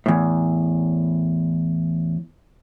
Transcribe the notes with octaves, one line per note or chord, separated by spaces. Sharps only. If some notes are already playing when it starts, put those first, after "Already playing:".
E2 A2